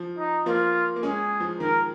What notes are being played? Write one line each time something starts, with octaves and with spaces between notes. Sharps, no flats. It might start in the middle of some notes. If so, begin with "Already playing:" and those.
Already playing: F3
D#4
F3 A#3 F4
A#3
G#3 C#4 G#4
F3
D#3 A#4